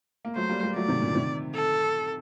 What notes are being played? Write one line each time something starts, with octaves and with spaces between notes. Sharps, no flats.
A#3
F#3 A3 C5
G3 A#3
G3 A#3
F#3 A3 D5
C3 D#3
A#2 D3
C3 D#3
A4